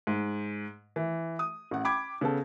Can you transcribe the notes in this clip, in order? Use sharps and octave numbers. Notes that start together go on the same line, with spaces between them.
G#2
E3
D#6
A1 F#5
G5 B5 D6 G#6
C#3 B3 A4